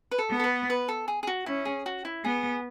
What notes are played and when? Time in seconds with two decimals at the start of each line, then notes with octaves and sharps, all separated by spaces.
0.11 B4
0.18 A4
0.31 B3
0.39 A4
0.44 B4
0.70 B4
0.88 A4
1.08 G#4
1.23 G#4
1.27 F#4
1.46 C#4 E4
1.65 G#4
1.86 F#4
2.05 E4
2.24 B3 G#4